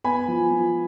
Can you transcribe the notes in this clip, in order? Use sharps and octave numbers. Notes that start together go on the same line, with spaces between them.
B3 G#5 B5
F3
F3